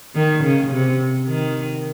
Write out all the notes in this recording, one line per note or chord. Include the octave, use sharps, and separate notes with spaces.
D#3
C#3
C3
D#3